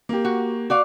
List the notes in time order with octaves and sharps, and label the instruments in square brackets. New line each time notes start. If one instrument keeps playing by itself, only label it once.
[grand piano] A#3 G4
[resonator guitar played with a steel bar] F#4
F#4 D5 F5